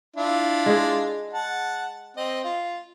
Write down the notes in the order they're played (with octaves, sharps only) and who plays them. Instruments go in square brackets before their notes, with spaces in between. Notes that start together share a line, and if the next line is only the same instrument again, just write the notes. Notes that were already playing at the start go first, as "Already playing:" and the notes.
[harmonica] D4 E4 F4
[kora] G#3 G#4
[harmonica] F#5 A5
C4 D#5
F4